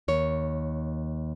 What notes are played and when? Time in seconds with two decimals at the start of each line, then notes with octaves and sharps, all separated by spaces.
0.08 D#2 C#5